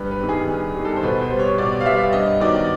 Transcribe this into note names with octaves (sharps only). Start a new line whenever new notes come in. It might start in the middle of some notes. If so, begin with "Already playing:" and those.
Already playing: G2 B4
B4
D#3 G3
G#4
G2
D#3 G3
A4
C5
B2 B4
C5
G3 B3
C#5
B2 D5
F5
G3 B3 E5
G2 D#5
D#3 F#3 B3 D5